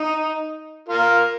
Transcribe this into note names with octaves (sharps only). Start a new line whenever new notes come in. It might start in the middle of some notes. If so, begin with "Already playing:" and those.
Already playing: D#4
F4 A#4